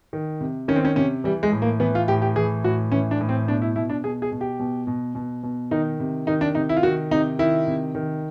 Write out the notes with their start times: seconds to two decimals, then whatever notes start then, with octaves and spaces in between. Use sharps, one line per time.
0.13 D#3
0.41 C3
0.68 D#3 C#4
0.76 C4
0.85 C#4
0.96 C3 C#4
1.24 E3 G3
1.43 G#3
1.52 A2
1.62 A#3
1.80 E3 B3
1.95 F4
2.08 A2 G4
2.22 G4
2.36 E3 G#4
2.64 A2 F#4
2.92 E3 C#4
3.11 D4
3.21 A2
3.29 C4
3.48 B2 D4
3.62 E4
3.76 B2 E4
3.90 D4
4.04 B2 G#4
4.22 G#4
4.32 B2
4.41 G4
4.60 B2
4.87 B2
5.15 B2
5.43 B2
5.71 D#3 D#4
6.00 C3
6.27 D#3 D#4
6.41 D4
6.55 C3 D#4
6.69 E4
6.77 F4
6.83 D#3 F#4
7.11 C3 D#4
7.39 D#3 E4
7.67 C3
7.95 D#3